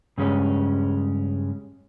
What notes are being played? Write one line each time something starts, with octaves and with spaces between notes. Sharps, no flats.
G2 C#3 G#3 C#4